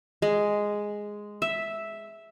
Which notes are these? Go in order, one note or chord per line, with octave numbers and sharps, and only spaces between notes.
G#3
E5